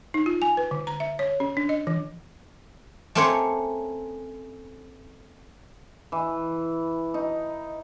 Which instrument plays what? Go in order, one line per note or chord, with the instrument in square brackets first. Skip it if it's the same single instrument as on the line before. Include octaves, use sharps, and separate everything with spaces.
[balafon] D#4
F4
G#5
B4
D3
A#5
E5
C#5
C#4
D4
D#5
E3
[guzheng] A3 A#3 C4 C#4 C5 C#5
[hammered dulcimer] E3
D#4